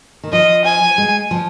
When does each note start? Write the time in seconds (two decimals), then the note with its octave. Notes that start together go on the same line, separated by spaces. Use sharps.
0.23 D#3
0.32 F3 D#5
0.65 G#5
0.98 G#3
1.31 F3